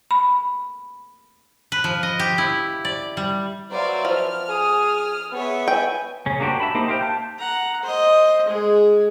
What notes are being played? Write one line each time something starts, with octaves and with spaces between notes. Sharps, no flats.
B5
B4
F3
D#5
G4
E4
D5
G3
F#3 B4 C5 D5 E5 F5
F3 F6
G#4 D#6
B3 G#4 B4 C#5 E5
G5 G#5
C#3 C#4
A#3 D4 F#4 G4 C5
E5 A5 B5
A#3 D#4 G4 C5
G4 C5 E5 F5 G5
A5 G6
F#5 A#5
C5 D#5
G#3 G#4